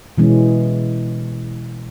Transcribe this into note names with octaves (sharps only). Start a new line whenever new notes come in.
B2 E3 G#3 C#4